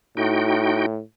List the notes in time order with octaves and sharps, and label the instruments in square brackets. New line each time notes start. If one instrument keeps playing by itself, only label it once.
[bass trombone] A2 [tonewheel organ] D#4 F#4 G5